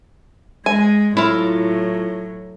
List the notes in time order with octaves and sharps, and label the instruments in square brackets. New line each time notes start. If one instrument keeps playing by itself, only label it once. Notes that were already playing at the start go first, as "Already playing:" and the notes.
[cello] G#3 [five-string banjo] G#5
[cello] A2 F#3 [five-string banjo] E4 F4